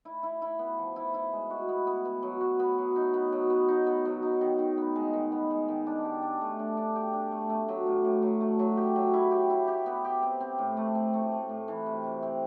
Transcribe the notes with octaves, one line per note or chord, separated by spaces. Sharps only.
E4
E4
E4
B3
F3
E4
E4
G#3
F#4
B3
B3
B3
F#3
F#4
B3
F#3
D#4
B3
F#3
B3
D#4
B3
F#3
D#4
D#3
D#3
B3
G#3
D#3
B3
G#3
D#3
D4
G4
D4
A3
D4
D4
G4
D4
A3
A3
F#3
A2
A2
F#3
A3
F#3
G4
F#3
E4
G4
E4
G4
B3
G4
C4
C4
A2
A3
C4
A3
A3
A2
E3
C3
C3
C4